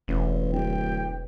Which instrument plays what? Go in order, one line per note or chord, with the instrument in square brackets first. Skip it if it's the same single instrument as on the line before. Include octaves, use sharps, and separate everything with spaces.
[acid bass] E1 [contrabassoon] A1
[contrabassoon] D1 [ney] G5